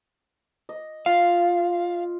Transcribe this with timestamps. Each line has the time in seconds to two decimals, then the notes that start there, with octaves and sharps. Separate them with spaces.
0.69 D#5
1.06 F4 F5